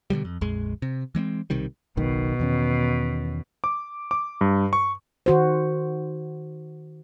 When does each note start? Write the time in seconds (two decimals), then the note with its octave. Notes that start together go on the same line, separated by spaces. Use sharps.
0.10 B2 D3 F3 G3
0.25 F2
0.41 A#1 F2 G#3
0.82 C3
1.15 E3 G#3 B3 C4
1.50 B1 C3 D#3 G3
1.97 F#1 B1 B2 D#3
2.39 E2 D#3 C#4
3.64 D6
4.11 D6
4.41 G2
4.73 C#6
5.26 D#3 F#4 C5